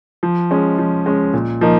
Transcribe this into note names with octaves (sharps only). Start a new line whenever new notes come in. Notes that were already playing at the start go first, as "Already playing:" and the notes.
F3
G#3 C#4
F3
G#3 C#4
A#2
F3 A#3 D#4